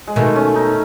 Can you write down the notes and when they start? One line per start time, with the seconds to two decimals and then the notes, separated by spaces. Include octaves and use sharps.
0.07 G#3
0.16 B2 D#3 A3
0.36 C#4
0.56 D#4